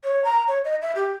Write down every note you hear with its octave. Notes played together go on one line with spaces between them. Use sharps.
C#5
A#5
C#5
D#5
E5
G4